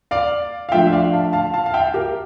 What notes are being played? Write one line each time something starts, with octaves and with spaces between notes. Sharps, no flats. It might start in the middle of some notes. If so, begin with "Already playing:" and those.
D5 F5
F5
F3 A3 D4 F4 E5 G5
E5
D5 F5
F5 A5
F5 A5
F5 A5
F5
E5 G5
G4 A#4